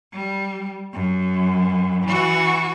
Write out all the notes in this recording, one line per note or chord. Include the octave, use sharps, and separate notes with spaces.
G3
F#2
E3 F#4